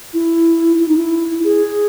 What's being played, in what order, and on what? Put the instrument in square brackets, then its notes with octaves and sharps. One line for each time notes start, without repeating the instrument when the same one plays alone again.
[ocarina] E4
E4
D#4
E4
G#4